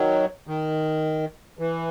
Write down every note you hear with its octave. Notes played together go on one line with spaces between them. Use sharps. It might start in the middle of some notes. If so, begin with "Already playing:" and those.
Already playing: D#3 F#3
D#3
E3